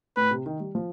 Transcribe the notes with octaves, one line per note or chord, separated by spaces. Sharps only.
A2 B4
C3
D#3
G3
F3